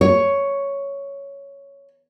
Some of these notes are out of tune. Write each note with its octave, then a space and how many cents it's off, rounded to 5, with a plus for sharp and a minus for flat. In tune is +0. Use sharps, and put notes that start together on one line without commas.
C#5 +5